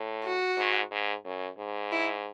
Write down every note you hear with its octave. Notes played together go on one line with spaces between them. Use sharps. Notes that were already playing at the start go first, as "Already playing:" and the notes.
Already playing: A2
F#4
G#2
G#2
F#2
G#2
E4